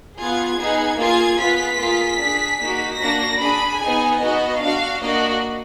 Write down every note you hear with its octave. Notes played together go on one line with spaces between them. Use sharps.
B3 F4 G#4 G#6
B3 D#4 G#4
A#3 F4 G#4 G#6
B3 F4 G#4 B6
A#3 F4 G#4
D4 G#4
A#3 D#4 F#4
A#3 D4 F#4 A#6
D4 G#4 B5
B3 D#4 G#4 G#5
B3 D#4 F#4 D#5
D4 F#4 F5
A#3 D4 F#4 D#5